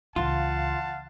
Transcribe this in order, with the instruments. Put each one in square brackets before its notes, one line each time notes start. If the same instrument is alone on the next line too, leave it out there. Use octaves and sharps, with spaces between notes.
[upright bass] C#2 E3 [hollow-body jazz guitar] F4 [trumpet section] F5 F#5 A5